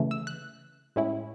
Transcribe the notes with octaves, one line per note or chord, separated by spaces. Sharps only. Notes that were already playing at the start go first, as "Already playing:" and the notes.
Already playing: C#3 E3 A3
E6
F#6
A2 G#3 C#4 E4